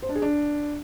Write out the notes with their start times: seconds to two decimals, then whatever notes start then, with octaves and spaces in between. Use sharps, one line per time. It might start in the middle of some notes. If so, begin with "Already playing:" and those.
0.02 C5
0.09 D4
0.16 G#4
0.22 D4